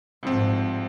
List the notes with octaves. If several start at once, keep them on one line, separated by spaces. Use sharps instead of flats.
C2 G#2 F3 C4